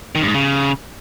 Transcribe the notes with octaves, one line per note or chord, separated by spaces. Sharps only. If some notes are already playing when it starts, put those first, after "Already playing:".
D#3
G2
G#2
C#3